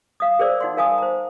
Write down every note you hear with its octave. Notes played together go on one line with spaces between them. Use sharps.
F5 D#6
G#4 A#4 C5 D5 E6
D#4 F#5 C6
A#4 F5 G#5 A5 D#6
C5 A#5